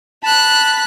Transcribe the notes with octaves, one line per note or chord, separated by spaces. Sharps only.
A5 B5 F#6